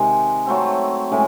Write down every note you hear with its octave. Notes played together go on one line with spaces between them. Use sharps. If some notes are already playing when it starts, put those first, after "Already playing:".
Already playing: C3 D#3 G#3
F#3 A3 C4
A2 E3 G#3 C#4